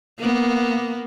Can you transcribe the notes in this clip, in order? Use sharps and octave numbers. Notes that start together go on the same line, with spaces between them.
A#3 B3